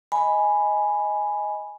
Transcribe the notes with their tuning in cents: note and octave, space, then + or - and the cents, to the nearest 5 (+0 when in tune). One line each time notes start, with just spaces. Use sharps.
D#5 +10 G#5 +0 B5 +0